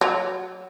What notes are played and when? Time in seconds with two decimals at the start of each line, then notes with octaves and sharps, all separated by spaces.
0.01 F#3